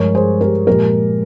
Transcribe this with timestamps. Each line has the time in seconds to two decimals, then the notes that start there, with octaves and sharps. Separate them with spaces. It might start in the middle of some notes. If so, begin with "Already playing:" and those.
Already playing: G2 F3 G#3 A#4 C#5
0.15 G#4 C5
0.41 G4 A#4
0.67 A#2 F3 G#3 G4 A#4